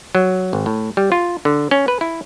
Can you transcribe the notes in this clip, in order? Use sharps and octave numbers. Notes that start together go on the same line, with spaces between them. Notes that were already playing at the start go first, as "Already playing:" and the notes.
F#3
G#1
A2
G3
F4
D3
C#4
B4
E4